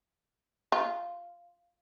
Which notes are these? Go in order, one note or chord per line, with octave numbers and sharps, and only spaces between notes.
F4